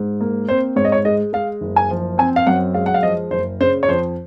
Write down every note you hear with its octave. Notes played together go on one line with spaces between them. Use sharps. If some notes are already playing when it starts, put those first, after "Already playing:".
Already playing: G#2
A#3
C4 C5
G#2 C#5
D#5
C#5
G#3 D#5
G#3 F5
F#1
G#5
F3
C4 G#5
F5
F#2 F#5
G#3 F5
F#5
F5
F3 D#5
F#1 C5
C#3 C5
C#5
F2 C5